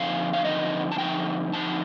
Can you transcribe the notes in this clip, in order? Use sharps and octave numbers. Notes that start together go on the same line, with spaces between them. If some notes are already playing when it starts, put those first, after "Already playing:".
Already playing: D3 F3 C4 D#4 F5
F5
D3 F3 C4 D#4 D#5
A5
D3 F3 C4 D#4 G5
D3 F3 C4 D#4 A5